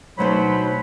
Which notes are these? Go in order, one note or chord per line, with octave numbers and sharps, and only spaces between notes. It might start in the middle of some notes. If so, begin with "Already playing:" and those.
D2 B2 F#3 D#4 C5 B5